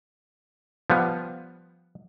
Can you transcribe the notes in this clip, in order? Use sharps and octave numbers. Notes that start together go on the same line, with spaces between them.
F3 G3 B3